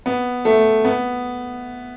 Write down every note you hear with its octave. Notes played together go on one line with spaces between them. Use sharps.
B3
A3
B3